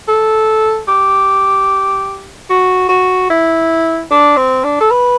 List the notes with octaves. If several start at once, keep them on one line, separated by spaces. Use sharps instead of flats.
A4
G4
F#4
F#4
E4
D4
C4
D4
A4
B4